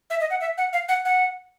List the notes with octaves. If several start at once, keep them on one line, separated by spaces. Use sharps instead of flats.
E5
D#5
F#5
E5
F#5
F5
F#5
F#5